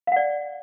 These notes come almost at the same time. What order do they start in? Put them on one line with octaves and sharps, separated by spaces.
F5 F#5 D5